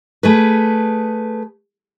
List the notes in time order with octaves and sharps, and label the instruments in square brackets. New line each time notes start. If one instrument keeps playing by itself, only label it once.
[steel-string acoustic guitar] A3 G#4 B4